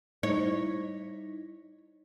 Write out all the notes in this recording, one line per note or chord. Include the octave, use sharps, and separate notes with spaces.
G3 D#4 E4 C#5